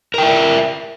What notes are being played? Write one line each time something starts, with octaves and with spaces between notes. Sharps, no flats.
A#4 E5 G5